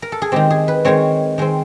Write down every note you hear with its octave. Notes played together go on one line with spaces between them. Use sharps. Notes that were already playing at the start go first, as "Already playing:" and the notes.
A#4
A4
G#4
D#3 G#3 C4 G4
G#4
B4
D#3 G#3 C4 C#5
D#3 G#3 C4